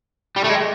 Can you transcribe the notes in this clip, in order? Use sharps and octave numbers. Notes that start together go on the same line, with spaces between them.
G3
A3
G#3